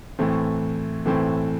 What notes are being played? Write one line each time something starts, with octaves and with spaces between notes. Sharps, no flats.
A2 E3 A3 C4
A2 E3 A3 C4